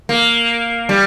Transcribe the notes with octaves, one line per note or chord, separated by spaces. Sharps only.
A#3
G3